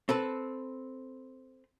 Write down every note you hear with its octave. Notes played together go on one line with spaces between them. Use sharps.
C4 A4 B4